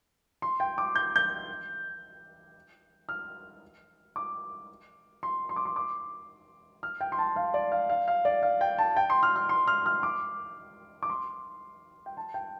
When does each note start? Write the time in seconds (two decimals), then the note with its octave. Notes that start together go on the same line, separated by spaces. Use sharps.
0.42 C6
0.60 G5
0.78 D6
0.95 G6
1.16 G6
3.09 F6
4.16 D6
5.23 C6
5.49 C6
5.56 D6
5.65 C6
5.76 D6
6.83 F6
7.01 G5
7.12 C6
7.18 A5
7.36 F5
7.54 D5
7.72 F5
7.89 F5
8.08 F5
8.25 D5
8.43 F5
8.61 G5
8.78 A5
8.96 G5
9.10 C6
9.23 F6
9.36 F6
9.49 C6
9.67 F6
9.86 F6
10.03 D6
11.03 D6
11.10 C6
12.06 G5
12.17 A5
12.34 G5